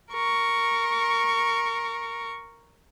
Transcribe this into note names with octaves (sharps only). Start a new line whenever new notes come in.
A#4 C#6